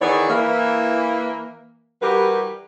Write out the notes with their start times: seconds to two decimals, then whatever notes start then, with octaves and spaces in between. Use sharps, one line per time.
0.01 D#3 E3 B3 G#4 C#5 D5
0.29 E3 A#3
2.02 E3 G3 F#4 G4 A#4 B4